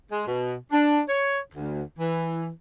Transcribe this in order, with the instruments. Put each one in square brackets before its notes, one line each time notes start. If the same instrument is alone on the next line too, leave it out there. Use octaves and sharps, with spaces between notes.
[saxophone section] G#3
B2
D4
C#5
D2
E3